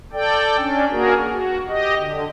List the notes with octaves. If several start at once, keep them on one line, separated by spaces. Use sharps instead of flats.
A4 D5 G5
C#4 D4
A#3 F#4 G#4 A#4
F#4
G4 D#5
D3